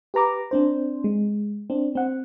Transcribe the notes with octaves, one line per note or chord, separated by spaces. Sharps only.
G4 B4 A#5 D6
C4 D4 C5
G#3
C4 D4
C4 F#5